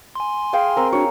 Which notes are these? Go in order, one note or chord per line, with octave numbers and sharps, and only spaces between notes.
G#5 C6
G#4 F5 G5
C4 A#4
D4 F#4 C#5